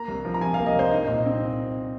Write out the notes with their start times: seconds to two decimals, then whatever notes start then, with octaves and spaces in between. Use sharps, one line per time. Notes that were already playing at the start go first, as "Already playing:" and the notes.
Already playing: A#3 A#5
0.08 C2
0.25 F3
0.34 A#5
0.41 C3 G#5
0.54 A#3 F5
0.66 D#5
0.75 C2 C5
0.91 D#4 D#5
1.08 A#2
1.25 C4